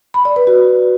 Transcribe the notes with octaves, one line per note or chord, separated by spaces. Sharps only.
B5
D5
B4
F#4